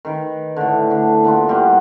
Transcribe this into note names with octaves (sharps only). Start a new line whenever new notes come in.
D#3 A#4 B4
A2 D3
D3 D4
A#3 B3 E4 F4
G2 G3 G4 F#5